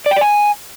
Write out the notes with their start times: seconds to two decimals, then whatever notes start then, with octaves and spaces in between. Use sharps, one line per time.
0.06 D5
0.11 G5
0.16 D5
0.21 G#5